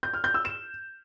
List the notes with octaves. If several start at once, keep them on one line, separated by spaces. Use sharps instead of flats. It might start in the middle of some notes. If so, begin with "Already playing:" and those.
G6
F6
G6
E6
E7